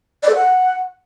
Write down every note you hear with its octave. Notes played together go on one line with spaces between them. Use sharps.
D5
A4
F#5